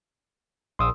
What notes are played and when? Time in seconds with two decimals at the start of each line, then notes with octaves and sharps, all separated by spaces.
0.79 A#1 C6 D#6 E6